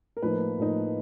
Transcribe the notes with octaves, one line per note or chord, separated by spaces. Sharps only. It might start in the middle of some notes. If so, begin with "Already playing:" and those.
A#4
A2 F3 A#3 D#4 B4
A2 F3 A#3 D#4